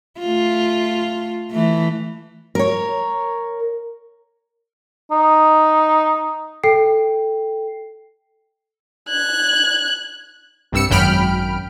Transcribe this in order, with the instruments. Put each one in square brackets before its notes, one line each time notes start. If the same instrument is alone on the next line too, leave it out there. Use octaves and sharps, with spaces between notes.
[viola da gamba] A3 F4
E3 A3
[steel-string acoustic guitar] A#4 C#5
[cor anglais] D#4
[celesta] A4 G5 C7
[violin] F#6 G#6
[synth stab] C2 G2 E6 C#7
G#1 F#2 G5 B5 F6 D7